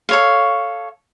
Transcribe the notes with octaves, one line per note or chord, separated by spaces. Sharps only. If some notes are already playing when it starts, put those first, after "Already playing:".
A4 C#5 F5